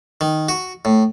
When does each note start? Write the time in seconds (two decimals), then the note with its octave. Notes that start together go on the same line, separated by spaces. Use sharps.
0.21 D#3
0.49 F#4
0.85 A2